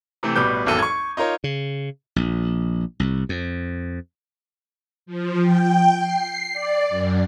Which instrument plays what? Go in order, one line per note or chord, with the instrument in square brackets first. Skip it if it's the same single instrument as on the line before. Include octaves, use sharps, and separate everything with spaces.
[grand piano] C3 E3 A3 C4
A1 B2 G3 B4 D6 G6
D#1 G#1 E2 F#3 A4 D#7
C#6 G#6
D#4 F4 A#4 C#5
[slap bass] C#3
A#1
C2
F2
[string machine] F3
G5
C7
D5
F#2